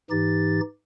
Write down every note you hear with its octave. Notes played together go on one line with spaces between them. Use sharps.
G#2 E3 D#4 G4 A6